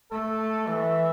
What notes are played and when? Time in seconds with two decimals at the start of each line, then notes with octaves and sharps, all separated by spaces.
0.11 A3 A4
0.68 E3 E5